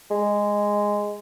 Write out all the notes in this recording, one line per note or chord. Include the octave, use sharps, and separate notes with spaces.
G#3